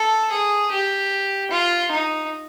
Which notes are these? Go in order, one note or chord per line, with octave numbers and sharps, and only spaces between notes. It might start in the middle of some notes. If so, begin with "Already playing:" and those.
Already playing: A4
G#4
G4
F4
D#4